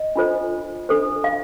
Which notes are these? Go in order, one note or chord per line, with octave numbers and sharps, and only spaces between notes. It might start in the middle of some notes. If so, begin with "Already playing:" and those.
Already playing: D#5
D4 F4 A4 C5
D4 A4 C5
F5